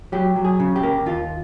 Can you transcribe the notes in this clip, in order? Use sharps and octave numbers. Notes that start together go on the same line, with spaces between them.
F#3 G4
F#3
G#4
C#3
G4
A#3
D#2 F4